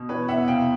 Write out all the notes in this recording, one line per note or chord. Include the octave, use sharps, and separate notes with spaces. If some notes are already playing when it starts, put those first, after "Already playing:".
Already playing: B2
E3 B4 C#5
E2 E5 F#5
C3 F5 G5